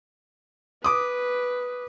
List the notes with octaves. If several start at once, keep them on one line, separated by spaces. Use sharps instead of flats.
B4 D6 D#6